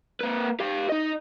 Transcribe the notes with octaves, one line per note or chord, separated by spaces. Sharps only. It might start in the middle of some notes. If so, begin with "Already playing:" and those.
A#3 B4
G4 F5
D#4 D#5